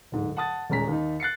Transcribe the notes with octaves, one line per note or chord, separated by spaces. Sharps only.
D1 G#2
F#5 A5 D#6 A6
D#1 G#3 C#4 A#5 B6
D#2 D#4
F#6 A6 C7 C#7